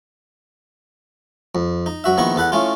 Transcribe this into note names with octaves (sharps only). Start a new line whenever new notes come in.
F2
D#4
F#2 F#4 E5
A#1 D#3 B3 E4 C#6
E2 A4 B4 F#5
A2 A3 C#4 F4